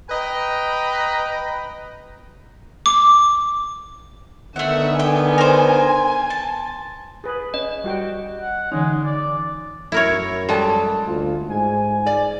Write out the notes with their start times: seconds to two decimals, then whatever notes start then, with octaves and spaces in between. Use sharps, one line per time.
0.10 B4 D#5 G5 A#5 B5
2.86 D6
4.56 D3 D#3 A3 B3 E5 F#5
4.99 G5 G#5
5.38 A#4 C5
6.30 A5
7.24 G#4 B4
7.54 C#4 D#5
7.84 G3 F#4 G5
8.41 F#5
8.72 D3 E3 G#3 C#4 D#4
9.03 D5
9.92 F#2 E4 A#4 C#5
10.49 G3 G#3 A4 A5
11.07 D2 F4
11.50 G#2 G#5
12.06 D5